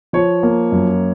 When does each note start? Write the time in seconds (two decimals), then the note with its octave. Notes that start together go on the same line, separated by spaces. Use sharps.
0.13 F3 C#5
0.43 A#3
0.72 F#2